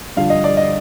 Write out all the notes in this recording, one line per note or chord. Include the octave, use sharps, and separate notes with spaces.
G2 D3 F3 F5
D#5
D5
D#5